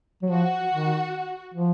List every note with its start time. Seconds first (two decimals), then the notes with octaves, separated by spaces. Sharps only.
0.22 F#3
0.31 F3 F#4
0.72 D#3
1.54 F3